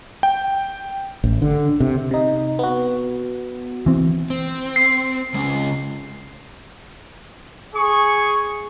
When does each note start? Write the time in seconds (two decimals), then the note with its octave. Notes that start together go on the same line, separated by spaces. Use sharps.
0.23 G5
1.24 A1
1.42 D3
1.80 C3
2.11 C3 D#4
2.59 B3 F#4
3.86 E3 C4
4.30 C4
4.76 C7
5.35 C#3 G#3 C#4
7.75 G#4 C#6